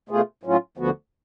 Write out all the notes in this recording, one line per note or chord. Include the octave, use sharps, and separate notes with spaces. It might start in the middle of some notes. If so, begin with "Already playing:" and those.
B2 A3 F4 G#4
A2 F#3 C#4 F4
D2 D3 F3 B3 F#4